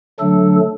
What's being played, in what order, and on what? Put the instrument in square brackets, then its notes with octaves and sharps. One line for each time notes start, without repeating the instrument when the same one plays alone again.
[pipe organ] D3 F#3 A3 D4 A4